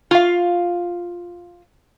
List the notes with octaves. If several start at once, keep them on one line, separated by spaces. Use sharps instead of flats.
F4 F5